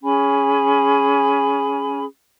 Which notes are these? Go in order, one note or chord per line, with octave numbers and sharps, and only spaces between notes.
C#4 G#4 G#5 B5